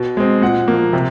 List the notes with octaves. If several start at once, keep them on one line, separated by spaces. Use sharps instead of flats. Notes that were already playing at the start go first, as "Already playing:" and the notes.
Already playing: B2
G#3 C4
A#2 F#5
F3 A#3
C3